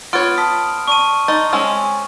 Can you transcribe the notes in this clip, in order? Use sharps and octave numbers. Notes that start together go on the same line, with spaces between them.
B3 F4 C#5 C6 F6 A6 D7
A5 D#6 B6
D5 A5 C#6 D#7
D#4 C6 A6
G#3 C4 C#4